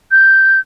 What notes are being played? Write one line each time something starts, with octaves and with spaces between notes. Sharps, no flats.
G6